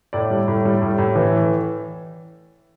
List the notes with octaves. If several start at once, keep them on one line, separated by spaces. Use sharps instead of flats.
A2 D5
G3
A2
G3
A2
A2
E3